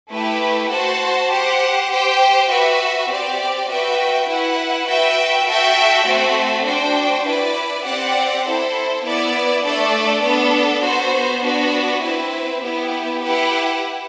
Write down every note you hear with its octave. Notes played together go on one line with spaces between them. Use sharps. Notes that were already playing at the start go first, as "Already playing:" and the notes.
A3 E4 G4 B4
F#4 C5 F#5 A5
G4 C5 F#5
G4 C5 G5
F#4 B4 E5
C4 G4 D5
F#4 B4 E5 G5
E4 B4 F#5
F#4 B4 E5 G5
F#4 A4 E5 G5
A3 C4 F#4
D4 F#4 C5 G5
E4 B4 D5
C4 G4 D5 F#5
E4 A4 C5
B3 E4 B4 D5
A3 D4 A4 D5
B3 D4 A4
B3 F#4 C5
B3 D4 F#4
C4 E4 B4
B3 E4 G4
E4 G4 B4 F#5